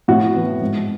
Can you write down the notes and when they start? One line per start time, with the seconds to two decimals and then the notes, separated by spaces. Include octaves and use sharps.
0.08 A2 F#4
0.35 E3 B3
0.62 G#2